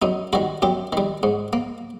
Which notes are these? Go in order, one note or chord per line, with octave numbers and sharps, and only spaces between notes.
F#2 D#4
D#3 G3 F#4
F#2 G4
D#3 G3
G#2
A#3